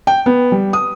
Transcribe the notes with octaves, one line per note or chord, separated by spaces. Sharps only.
G5
B3
G3
D#6